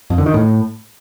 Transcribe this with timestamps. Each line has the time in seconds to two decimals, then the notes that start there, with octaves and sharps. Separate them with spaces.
0.10 F2
0.18 D3
0.26 D#3
0.34 A2